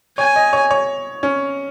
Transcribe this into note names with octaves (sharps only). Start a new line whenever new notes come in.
C#5 G#5
D#5
C#5
C#5
C#4